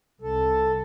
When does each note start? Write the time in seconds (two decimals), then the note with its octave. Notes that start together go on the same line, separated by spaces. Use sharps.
0.22 C2 A4